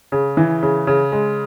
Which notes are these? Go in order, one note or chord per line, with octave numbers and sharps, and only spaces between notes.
C#3
E3
C#3
C#3
G#3